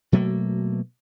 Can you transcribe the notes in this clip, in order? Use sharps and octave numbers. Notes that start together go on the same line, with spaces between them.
B2 F#3 A3 A#3